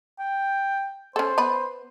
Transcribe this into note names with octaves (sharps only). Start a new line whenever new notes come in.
G5
C#4 A4 C5
B3 B4 B5